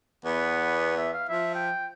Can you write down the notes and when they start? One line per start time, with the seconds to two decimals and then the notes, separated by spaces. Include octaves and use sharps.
0.25 E2 B3
0.97 E5
1.13 F5
1.29 F3 E5
1.55 G5